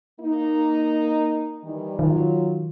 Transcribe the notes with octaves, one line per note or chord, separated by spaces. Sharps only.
A#3 D#4
D#3 E3 G3
D#3 F#3 F4